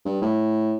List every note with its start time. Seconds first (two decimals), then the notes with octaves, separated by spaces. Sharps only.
0.05 G2
0.22 A2